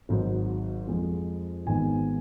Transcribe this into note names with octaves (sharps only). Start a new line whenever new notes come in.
G#1 G#2 F#3
F2 F3 G#3
G#1 G#2 D#3 G#3 B3 G#5